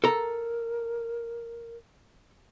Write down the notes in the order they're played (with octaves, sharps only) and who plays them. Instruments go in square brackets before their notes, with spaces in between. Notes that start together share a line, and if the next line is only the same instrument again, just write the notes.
[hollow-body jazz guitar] A4 A#5 [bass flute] A#4